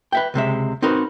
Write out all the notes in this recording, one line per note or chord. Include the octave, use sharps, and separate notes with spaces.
B4 E5 G5
C#2 C3 G#3 E5
C4 D#4 F#4 A#4 B4